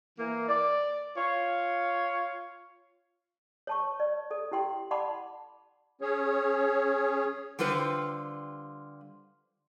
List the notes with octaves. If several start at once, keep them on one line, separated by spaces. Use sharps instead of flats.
E3 A#3
D5
F4 C#5
C#5 A5 C#6
D5
A4 D5
E4 G4 G5 C6
D5 F#5 A5 B5 C6 D6
C#4 G#4 C#5
D3 G3 F4 B4 C5